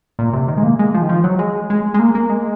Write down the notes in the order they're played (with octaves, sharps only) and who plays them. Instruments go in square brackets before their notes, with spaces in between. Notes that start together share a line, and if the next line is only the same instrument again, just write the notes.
[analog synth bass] A#2
C3
D#3
G#3
A#3
G#3
F3
D#3
F3
F#3
G#3
G#3
G#3
A#3
A#3
G#3